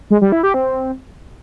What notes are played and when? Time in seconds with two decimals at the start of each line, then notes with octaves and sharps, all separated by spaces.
0.10 G#3
0.21 G3
0.32 E4
0.43 G4
0.54 C4